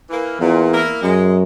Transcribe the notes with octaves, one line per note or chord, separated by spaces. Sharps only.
E3 A#3
E2 A#2
A#3 E4 A#4
F#2 G#3